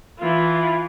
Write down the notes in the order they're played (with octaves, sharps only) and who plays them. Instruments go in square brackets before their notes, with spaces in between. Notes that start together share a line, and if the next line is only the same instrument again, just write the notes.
[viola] E3 F4